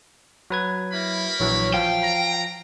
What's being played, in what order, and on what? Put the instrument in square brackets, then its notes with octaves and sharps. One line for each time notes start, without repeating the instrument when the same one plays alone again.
[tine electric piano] F#3 B4 G#6
[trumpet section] A#3 A#4 B5 [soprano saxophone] E4
[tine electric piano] A#1 E3 F#3 [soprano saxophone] C#5
[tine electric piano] F3 [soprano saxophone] F5 [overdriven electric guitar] G5
[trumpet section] A#5